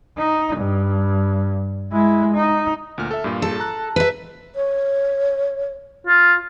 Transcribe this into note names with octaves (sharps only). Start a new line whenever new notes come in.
D#4
G2
G#3 E4
D#4
D2 A#2 F6
A4 E5
G2 A#2 F4
A4
A#5 F#6
B4 E5
C#5
F4